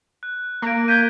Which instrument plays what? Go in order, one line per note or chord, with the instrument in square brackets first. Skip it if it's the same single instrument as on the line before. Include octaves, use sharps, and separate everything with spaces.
[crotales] F#6
[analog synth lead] A#3 [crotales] A#6 D7
[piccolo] G6 [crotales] G#6 B6 D#7